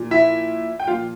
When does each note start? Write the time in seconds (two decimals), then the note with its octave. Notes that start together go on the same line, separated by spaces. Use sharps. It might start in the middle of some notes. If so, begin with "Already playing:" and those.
Already playing: A#2 F3
0.11 E4 E5
0.80 G5
0.87 A#2 F3 F4 F5